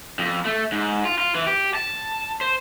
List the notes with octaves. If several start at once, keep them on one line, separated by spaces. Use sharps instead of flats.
F2
A3
G#2
F4
F4
E3
G4
A5
C5